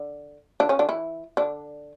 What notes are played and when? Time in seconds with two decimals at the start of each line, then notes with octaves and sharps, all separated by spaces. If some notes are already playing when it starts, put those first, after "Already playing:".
Already playing: D3
0.60 D3 D4
0.69 C#3 C#4
0.79 D3 D4
0.89 E3 E4
1.37 D3 D4